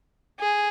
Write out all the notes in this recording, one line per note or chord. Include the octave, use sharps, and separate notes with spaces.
G#4